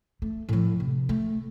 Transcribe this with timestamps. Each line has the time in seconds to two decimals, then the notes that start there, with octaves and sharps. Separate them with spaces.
0.22 A3
0.49 A2 F3
0.80 C3
1.09 A3